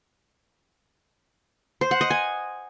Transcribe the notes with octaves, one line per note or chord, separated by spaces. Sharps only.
C5
F#5
D#5
G#5